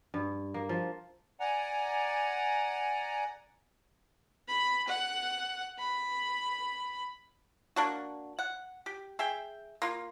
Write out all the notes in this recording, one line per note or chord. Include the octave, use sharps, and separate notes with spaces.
G2
A#3
F3
D5 F#5 G#5 A#5
B5
F#5
B5
A#3 D4 F#4
F#5
G4
G#4 E5 G5
A#3 F4